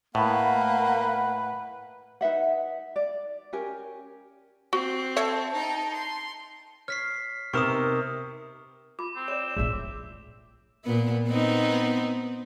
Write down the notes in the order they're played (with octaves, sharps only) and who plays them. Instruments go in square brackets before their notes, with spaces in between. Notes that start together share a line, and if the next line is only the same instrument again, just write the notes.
[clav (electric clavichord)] A2 [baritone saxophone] A#3 [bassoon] B4 [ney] F#5
[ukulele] D#4 B4 E5 F#5
D5
C#4 G4 A#4 G#5
[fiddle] C4 [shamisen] F#4
[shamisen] A4 C#5 E5 [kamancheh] A5
[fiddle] D#4 G5
C6
[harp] C#5 [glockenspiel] F6 B6 C7
[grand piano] C3 F6 E7 [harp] B3 D#4 A#4 [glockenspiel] C#6 D#6
[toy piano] F4 B5 [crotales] D6
[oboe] C4
[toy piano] C#5 D5 [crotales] E7
[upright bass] A#1 C4 [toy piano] G#4 [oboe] E5
[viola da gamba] A#2 B3
B3 C4 D#4